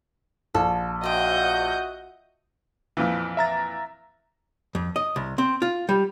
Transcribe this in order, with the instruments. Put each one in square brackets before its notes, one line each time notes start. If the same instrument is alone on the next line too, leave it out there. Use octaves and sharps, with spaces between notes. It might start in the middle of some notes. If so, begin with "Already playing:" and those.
[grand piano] A#1 [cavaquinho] A4
[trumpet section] F#4 E5 F#5 [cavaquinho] C5 G5 [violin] D#5 G6
[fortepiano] F2 A#2 E3
[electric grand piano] E5 A#5 A6
[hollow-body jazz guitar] F2
D#5
C2
C4
F4
G3